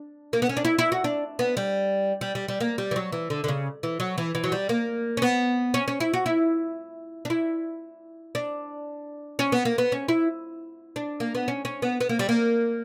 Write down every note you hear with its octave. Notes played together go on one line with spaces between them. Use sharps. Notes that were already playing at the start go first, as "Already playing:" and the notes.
Already playing: D4
A#3
B3
C#4
D4
E4
E4
F#4
D4
B3
G3
G3
G3
G3
A#3
G3
E3
F#3
E3
D3
D3
C#3
E3
F#3
E3
E3
F#3
G3
A#3
C#4
B3
C#4
C#4
E4
F#4
E4
D4
E4
D4
C#4
B3
A#3
B3
C#4
E4
D4
A#3
B3
C#4
C#4
B3
B3
A#3
G3
A#3